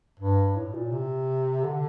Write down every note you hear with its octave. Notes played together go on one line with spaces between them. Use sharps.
G2
A2
A#2
C3
D3